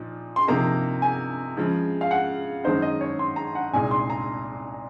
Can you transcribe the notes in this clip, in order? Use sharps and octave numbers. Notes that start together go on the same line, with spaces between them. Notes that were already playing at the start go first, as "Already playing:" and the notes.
Already playing: A#2 F3 D#4
C6
C3 F3 A#3 D#4 A#5
G#5
C#3 F3 G#3
F5
F#5
F#2 D#3 G#3 D#4 C5
D#5
C#5
C6
A#5
F#5
C2 A#2 G#3 D#4 G#5
C6
A#5